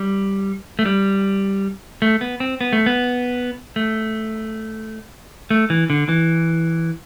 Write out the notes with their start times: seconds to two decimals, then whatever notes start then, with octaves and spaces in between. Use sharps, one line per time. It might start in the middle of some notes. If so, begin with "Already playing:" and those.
Already playing: G3
0.79 A3
0.86 G3
2.02 A3
2.21 B3
2.40 C4
2.61 B3
2.73 A3
2.86 B3
3.76 A3
5.51 A3
5.70 E3
5.90 D3
6.09 E3